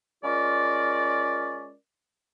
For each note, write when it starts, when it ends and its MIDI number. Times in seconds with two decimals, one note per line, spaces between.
0.23 1.74 56
0.23 1.74 61
0.23 1.74 65
0.23 1.74 70
0.23 1.74 74